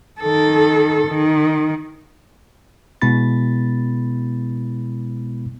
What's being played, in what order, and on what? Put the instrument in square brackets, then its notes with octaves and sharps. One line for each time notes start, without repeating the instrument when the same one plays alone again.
[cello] D#3 A4
D#3
[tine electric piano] B2 G#3 B3 E4 B5 A6